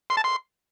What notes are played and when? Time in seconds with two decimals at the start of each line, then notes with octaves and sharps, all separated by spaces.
0.10 C6
0.17 A5
0.24 C6